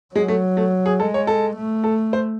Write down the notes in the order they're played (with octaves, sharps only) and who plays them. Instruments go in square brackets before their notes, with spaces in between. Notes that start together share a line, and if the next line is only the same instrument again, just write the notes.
[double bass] F#3 [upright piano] G#3
[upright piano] A3
A3
G#4
[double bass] G#3 [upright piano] A4
[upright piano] C#5
A4
[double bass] A3
[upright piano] A4
C5